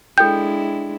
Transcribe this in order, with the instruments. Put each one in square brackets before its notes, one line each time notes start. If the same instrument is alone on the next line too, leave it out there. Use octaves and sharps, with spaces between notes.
[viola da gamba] G#3 D4 E4 [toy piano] A4 G5 [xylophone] G6